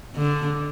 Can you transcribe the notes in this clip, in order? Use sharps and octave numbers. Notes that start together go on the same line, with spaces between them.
D3